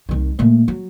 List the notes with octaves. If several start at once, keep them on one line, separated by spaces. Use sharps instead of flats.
C2 D#3
A#2 A3
F#3